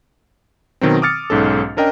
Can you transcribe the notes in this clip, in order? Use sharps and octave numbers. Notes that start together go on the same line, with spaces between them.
B2 D#3 F#3 C4
D6 D#6 F6 A6 C#7
B1 G#2 C#4 A4
C#4 D4 A#4 D#5 G5